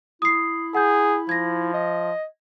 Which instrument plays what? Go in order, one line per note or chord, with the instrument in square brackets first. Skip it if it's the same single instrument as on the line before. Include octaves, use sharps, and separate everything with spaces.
[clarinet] E4 [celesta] D#6 C7
[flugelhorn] G#4 [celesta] F#5 G6
[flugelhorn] F3 [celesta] G#6 A#6
[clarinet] D#5